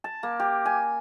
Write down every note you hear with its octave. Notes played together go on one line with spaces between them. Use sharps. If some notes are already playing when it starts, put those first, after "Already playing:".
A5
A#3
G4
G#5